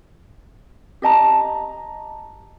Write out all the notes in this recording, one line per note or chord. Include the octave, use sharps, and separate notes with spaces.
G4 D#5 A5 A#5